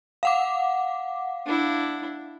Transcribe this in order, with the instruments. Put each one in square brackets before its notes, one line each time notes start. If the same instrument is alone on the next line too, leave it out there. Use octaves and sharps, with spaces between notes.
[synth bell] F5 F#5 D6
[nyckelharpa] D4 E4